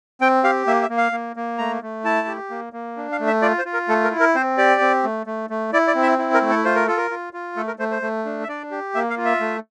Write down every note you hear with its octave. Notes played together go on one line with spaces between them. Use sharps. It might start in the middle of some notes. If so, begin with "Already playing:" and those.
C4 G5
G4 F5
A#3 E5
E5
A#3
F5
A#3
A#3
A3 A#5
A3
E4 A5
G4
A#3
A#3
D4
F5
A3
E5
F4 D5
C5
F4
A#4
A3 A4
A#4
E4
A#4
C4 C5
G4 D5
C4
A3
A3
A3
E4 D5
D5
C4
E5
E4
A#4
A3
A4
F4 C5
A#4
F4 A4
A#4
F4
F4
A3 A4
A#4
A3 C5
C5
A3
D4
E5
D4 D5
G4
A#3 E5
F5
F4
E5
A3